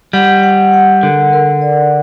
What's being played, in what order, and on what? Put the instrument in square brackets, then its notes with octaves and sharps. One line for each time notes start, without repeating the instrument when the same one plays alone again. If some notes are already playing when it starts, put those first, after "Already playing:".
[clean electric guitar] G3 [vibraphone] F#5
[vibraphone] F#5
F#5
[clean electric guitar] D3 [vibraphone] A#4
[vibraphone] A#4
D5